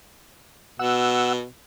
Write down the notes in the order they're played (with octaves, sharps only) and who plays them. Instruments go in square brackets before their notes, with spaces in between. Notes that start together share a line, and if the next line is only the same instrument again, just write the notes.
[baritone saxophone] B2 [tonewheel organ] F#5 E6